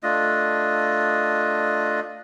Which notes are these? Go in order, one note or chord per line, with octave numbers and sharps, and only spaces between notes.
A3 D4 F4 D#5